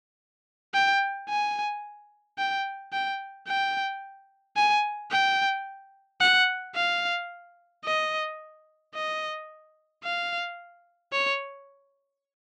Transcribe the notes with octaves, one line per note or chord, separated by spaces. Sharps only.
G5
G#5
G5
G5
G5
G#5
G5
F#5
F5
D#5
D#5
F5
C#5